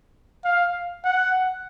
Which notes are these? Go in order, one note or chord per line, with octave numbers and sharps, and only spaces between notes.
F5
F#5